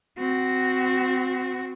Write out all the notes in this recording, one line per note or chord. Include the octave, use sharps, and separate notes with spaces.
C4 F#4